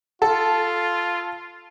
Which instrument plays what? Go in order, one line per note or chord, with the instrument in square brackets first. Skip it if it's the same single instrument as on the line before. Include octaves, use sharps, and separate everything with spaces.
[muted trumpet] F4 [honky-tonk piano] A4